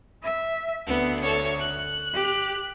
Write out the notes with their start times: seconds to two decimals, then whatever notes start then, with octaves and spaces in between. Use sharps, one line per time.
0.22 E5
0.87 D2 B3
1.22 A4 C#5
1.60 F#6
2.13 G4